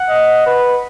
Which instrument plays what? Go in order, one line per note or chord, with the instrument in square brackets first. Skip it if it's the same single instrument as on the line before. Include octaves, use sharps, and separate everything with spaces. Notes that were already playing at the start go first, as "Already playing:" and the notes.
Already playing: [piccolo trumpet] F#5
[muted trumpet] D#5
B4